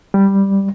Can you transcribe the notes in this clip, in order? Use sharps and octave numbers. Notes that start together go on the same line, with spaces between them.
G3